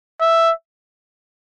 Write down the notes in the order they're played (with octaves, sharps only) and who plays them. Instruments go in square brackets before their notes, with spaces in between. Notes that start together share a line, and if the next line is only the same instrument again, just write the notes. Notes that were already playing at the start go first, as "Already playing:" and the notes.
[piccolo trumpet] E5